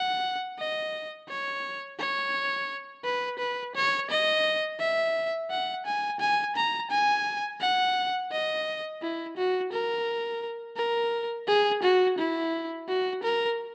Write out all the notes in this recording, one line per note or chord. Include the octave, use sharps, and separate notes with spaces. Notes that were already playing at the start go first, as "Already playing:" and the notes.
Already playing: F#5
D#5
C#5
C#5
B4
B4
C#5
D#5
E5
F#5
G#5
G#5
A#5
G#5
F#5
D#5
E4
F#4
A#4
A#4
G#4
F#4
E4
F#4
A#4